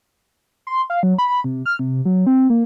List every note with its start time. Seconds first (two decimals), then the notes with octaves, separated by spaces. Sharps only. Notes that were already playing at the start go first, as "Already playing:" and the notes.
0.67 C6
0.90 F5
1.03 F#3
1.18 B5
1.44 C3
1.66 F6
1.79 C3
2.05 F#3
2.27 C4
2.50 A#3